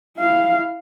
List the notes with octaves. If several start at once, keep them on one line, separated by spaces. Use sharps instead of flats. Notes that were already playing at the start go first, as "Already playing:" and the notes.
E4 F5